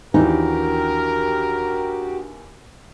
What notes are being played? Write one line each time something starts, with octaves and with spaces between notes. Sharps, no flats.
D#2 E3 D4 D#4 F#4 G4 A#4